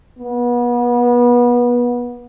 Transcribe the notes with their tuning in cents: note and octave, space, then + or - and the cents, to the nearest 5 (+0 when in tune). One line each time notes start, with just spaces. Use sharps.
B3 -30